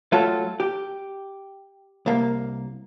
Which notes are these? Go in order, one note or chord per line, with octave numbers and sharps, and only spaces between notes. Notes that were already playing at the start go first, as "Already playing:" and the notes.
F#3 A3 F4 A4
G4
C2 A#3